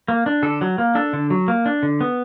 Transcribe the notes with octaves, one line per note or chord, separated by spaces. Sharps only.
A#3
D4
D3 A4
F#3
A#3
D4 A4
D3
F#3
A#3
D4
D3
B3